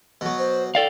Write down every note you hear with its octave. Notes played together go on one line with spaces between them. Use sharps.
B2 F#3
C5
A4 D5 F5 G5